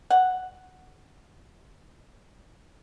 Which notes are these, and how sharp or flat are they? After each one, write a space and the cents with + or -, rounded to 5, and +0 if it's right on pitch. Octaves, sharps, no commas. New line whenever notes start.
F#5 +0